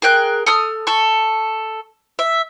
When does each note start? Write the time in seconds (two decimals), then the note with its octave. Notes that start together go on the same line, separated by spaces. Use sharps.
0.02 G#4 A#4 G5 F#6
0.46 A4 D#6 F6
0.87 A4 C#6
2.19 E5